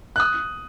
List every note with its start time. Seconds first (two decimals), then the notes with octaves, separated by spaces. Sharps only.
0.16 F#6
0.20 D#6